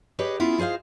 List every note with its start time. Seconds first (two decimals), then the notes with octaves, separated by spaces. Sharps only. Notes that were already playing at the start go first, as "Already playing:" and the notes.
0.19 G4 G#4 B4 C#5 D#5
0.40 B3 C#4 E4 F4 G#4 E5
0.58 F4 G#4 C5 D#5 F5